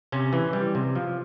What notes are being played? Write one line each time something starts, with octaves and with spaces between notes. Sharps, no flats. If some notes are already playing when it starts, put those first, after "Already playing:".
C3 C#4
E3
G3
C3
F3